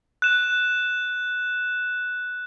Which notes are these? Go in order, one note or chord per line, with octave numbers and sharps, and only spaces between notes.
F#6 E7